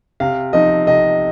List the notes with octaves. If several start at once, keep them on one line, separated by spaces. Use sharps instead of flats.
C3 F5
F3 C4 D#4 D#5
C3 D#5